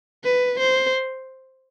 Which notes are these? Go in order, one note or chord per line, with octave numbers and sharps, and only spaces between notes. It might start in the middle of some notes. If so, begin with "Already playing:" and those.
B4
C5